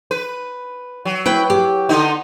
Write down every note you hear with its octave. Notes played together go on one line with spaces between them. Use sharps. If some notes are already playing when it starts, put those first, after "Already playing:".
B4
F#3
E4 B4 G5
G4
D3 B3 D#4